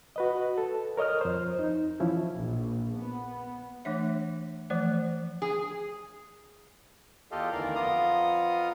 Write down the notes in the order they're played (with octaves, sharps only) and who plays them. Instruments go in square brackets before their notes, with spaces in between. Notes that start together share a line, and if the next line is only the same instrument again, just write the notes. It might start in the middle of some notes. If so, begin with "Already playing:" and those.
[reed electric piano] F#4 B4 D#5
A4
A#4 C#5 D#5 D#6 F6
F2 C5
D#4
E3 F3 C#4 E4
[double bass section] A#1
B3
[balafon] E3 A3 D4 C#5 E5
E3 F3 A3 C5 D5
[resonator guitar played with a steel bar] G#4
[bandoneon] E2 F4 G4 A4 D#5 F5
D2 D#3 E3 A#4 D5 F5
F2 B3 F4 F5 A#5 D#6